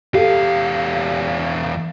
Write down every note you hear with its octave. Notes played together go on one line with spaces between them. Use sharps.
E2 G4 A4 F5